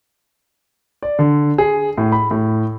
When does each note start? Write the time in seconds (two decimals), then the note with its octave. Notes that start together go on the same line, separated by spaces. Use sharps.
1.03 D5
1.19 D3
1.58 G#4
1.98 A2
2.12 B5
2.31 A2